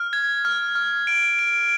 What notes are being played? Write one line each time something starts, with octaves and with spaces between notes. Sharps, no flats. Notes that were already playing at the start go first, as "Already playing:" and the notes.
Already playing: F6
G#6
F6
F6
D7
D7